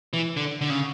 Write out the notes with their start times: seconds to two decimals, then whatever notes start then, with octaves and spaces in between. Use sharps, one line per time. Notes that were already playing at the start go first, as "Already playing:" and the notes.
0.13 E3
0.37 D3
0.61 D3
0.70 C#3